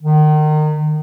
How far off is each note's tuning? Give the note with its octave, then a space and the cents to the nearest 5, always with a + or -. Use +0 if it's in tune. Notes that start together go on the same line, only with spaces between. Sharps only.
D#3 -30